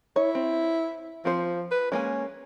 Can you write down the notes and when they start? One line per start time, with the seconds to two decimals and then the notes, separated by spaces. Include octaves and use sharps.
0.16 E4 C#5
0.35 C4
1.25 F3 C4 C5
1.71 B4
1.92 G#3 A#3 C#4 G#5